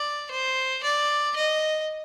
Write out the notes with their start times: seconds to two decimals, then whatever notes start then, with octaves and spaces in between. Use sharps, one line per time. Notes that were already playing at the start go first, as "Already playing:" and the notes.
Already playing: D5
0.31 C5
0.84 D5
1.36 D#5